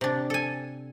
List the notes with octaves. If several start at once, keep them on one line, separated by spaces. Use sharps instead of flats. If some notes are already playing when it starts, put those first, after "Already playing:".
C3 D4
A4 G#5